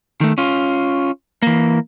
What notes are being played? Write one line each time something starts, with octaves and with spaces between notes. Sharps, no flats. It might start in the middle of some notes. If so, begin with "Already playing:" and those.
D#3 A3
C#4 F4
E3 A#3